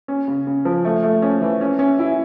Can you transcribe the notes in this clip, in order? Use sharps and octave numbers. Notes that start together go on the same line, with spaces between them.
C#4
C#3
C#3
F3
A3
A3
C#4
E3
C#4
C#4
E4